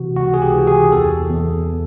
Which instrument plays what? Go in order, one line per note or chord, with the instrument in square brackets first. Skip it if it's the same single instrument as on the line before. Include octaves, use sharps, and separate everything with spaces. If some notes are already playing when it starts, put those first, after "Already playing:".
Already playing: [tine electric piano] C3 E3 F#4
C#2 F#4
G#4
G4
E3
G#4
E2 A4
E2